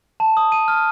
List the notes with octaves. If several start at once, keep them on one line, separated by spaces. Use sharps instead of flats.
A5
D#6
D#7
F6